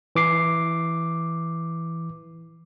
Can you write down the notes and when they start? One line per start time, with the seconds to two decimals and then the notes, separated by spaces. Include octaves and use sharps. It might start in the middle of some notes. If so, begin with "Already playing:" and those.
0.16 E3 D6 C7